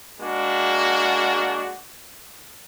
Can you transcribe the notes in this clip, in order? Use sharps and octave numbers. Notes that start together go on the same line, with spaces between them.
G#3 A#3 D4 F#4